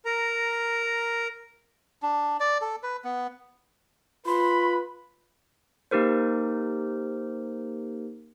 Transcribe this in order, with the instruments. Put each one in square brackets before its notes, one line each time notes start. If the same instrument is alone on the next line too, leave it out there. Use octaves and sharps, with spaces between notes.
[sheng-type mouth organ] A#4 A#5
[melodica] D4
D5
A4
B4
B3
[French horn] F4 [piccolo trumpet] B4 [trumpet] B5 [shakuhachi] C6
[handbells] A#3 D#4 G4 A#4 C5